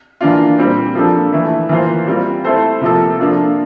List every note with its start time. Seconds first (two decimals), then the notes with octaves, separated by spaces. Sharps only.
0.21 E3 A#3 D4 F4
0.58 A#2 G3 C4 G4
0.95 F3 A#3 D4 A4
1.32 E3 A3 E4
1.69 E3 A#3 F4 C5
2.07 G3 C4 F4
2.44 A3 E4 A4 C5
2.81 C3 F3 A#3 F4 A4
3.19 F3 A#3 D4 F4 A4